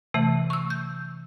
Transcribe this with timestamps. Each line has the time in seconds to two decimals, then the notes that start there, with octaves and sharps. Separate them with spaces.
0.14 C3 E3 A3
0.50 C#6 E6
0.70 G6